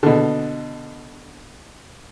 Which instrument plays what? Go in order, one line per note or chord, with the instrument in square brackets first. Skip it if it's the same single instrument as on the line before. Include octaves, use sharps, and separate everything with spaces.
[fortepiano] B2 D3